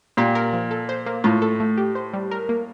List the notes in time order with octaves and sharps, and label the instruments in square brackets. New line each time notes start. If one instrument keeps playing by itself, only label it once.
[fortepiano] A#2 [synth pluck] G4
[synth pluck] A#4
F3
A4
C5
A#3
[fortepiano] A2 [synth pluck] F4
[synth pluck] A4
A3
G4
C5
G3
A#4
A#3